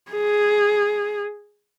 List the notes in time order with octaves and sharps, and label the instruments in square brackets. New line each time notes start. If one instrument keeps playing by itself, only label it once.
[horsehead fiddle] G#4